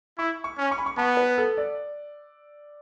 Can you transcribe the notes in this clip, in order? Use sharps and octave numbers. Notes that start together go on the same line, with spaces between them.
E4 C#6
C#6
C#4
C#6
B5
C#6
B3 A5
B4
A4
D5